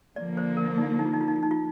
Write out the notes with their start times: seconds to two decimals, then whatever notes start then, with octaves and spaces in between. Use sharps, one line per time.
0.16 D3 F3 A#3 D5
0.37 C5
0.57 A#4
0.78 D#4
0.99 D#4
1.06 F4
1.13 D#4
1.21 F4
1.28 D#4
1.36 F4
1.43 D#4
1.51 F4